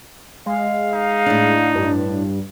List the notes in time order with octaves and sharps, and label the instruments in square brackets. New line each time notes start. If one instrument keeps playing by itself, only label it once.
[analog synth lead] G#3 [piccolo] F5
[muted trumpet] D#4
[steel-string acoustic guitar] A2 D4
[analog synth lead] G2